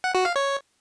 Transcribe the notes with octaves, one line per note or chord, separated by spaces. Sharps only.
F#5
F#4
F5
C#5